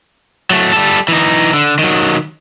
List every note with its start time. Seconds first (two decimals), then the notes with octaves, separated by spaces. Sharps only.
0.51 F#3 A3
0.72 G3 A4
1.08 E3 D#4
1.54 D3
1.79 D#3 F#3